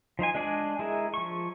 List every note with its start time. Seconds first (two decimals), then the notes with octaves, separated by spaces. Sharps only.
0.19 F3 D#4 C5 G#5
0.34 G#3 D4 G#4 D5 G#5
0.79 G#3 E4 G#4 A#4
1.14 F3 C#6